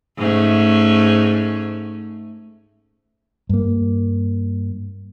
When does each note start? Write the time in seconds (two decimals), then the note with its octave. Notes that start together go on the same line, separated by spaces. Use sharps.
0.17 G#2 A3 C#4
3.49 G2 A#3